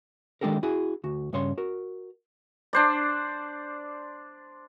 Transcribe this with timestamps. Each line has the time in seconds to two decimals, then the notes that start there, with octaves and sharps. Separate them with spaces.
0.41 D#3 G#3 D4 G4 A4 A#4
0.63 E4 F#4 G#4
1.04 D2 F#4
1.33 G2 C#3 C#5 C6
1.58 F#4 A#4
2.73 D4 C5 D5